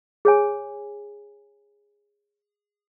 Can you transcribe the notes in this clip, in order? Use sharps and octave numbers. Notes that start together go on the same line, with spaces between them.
G#4 C#5 G#5